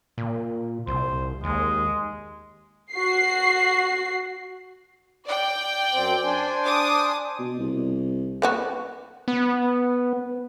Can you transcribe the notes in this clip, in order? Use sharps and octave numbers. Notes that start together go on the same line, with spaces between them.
A#2
C2 C5
D#2 G#3
F#4 C7
D5 G5
F#2 C4
D4 C5 G#5
D6 D#6
B2
C2
A#3 B3 F#4
B3